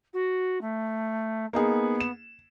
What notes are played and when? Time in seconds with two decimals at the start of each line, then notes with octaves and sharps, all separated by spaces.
0.13 F#4
0.61 A3
1.53 A#3 B3 D#4 G#4
2.00 E7